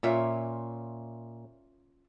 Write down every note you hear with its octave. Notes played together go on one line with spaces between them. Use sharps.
A#2 C#4 F4 E5